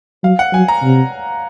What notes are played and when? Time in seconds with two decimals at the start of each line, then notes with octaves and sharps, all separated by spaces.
0.24 F#3 F5
0.39 F#5
0.53 F#3 G#5
0.68 A#5
0.83 C3